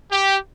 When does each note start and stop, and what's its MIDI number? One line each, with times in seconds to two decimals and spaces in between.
0.11 0.36 67